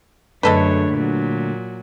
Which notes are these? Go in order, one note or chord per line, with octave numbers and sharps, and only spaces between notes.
F#2 D3 G#3 A3 D4 A4 B4 C#5
A#2 F#3